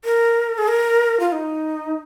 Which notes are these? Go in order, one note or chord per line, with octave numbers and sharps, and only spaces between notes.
A#4
G#4
A#4
F4
D#4